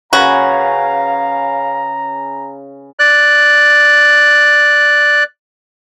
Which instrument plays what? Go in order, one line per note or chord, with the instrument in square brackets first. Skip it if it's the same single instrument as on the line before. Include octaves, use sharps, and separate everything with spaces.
[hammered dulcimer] C#3 B4 [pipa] F#4 [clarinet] F5 [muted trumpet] A#5
[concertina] D5 F#6